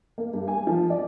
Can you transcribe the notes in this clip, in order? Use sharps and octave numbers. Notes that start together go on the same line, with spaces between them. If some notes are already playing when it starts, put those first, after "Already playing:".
A#3
G2
G#5
F3
D5